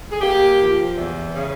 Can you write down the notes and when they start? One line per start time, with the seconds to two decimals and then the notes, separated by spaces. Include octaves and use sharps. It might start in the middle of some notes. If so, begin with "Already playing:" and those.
0.11 G#4
0.21 A#3 G4
0.58 F3
0.96 E2
1.34 C#3